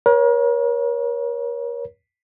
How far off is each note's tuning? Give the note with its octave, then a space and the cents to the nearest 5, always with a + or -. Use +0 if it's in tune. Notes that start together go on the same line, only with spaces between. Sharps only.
A#4 +40 C#5 +0